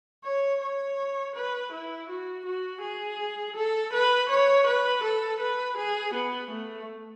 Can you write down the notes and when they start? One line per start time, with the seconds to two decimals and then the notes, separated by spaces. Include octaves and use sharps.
0.24 C#5
0.61 C#5
1.36 B4
1.72 E4
2.09 F#4
2.45 F#4
2.82 G#4
3.56 A4
3.93 B4
4.29 C#5
4.67 B4
5.03 A4
5.40 B4
5.77 G#4
6.14 B3
6.51 A3